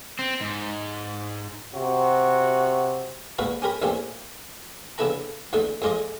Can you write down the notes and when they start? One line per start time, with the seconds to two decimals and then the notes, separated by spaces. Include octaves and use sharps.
0.19 C4
0.41 G#2
1.75 C3 F#4
3.38 A#1 G#2 B2 F#4 B4 F5
3.62 C#4 G4 A#4 B5
3.82 A1 E2 A#3 C4 C#4 G4
4.98 C#3 B3 D4 E4 A4 A#5
5.53 E2 D3 A3 D#4
5.82 F2 G#3 F4 D5 D#5